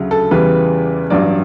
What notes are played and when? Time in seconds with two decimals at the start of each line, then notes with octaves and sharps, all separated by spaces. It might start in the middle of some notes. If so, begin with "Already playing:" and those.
Already playing: D2 C#3 F#3
0.11 A4
0.31 E2 C#3 E3 G3 B4
1.10 A1 G2 F#3 D5